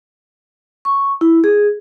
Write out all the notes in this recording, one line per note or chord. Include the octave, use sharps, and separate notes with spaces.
C#6
E4
G#4